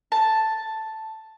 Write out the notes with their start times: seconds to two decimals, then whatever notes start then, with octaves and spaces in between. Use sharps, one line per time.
0.12 A5